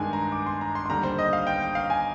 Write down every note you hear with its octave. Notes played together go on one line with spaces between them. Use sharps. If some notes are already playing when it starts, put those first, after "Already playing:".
Already playing: G2 D#3 G#3 G#5
A#5
D6
C6
A#5
C6
C6
D#2 D3 G3 A#5
C5
D#5
F5
G5
G5
F5
G#5